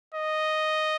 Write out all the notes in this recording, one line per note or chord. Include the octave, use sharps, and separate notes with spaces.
D#5